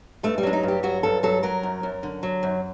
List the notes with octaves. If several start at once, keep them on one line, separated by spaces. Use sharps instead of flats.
G2 A3
G3
F#3 D4
D#4
G2 G4
F#3 F#4
G2 A4
F#3 A4
F#3 A#4
F#2
F#2
D3
F#3
F#2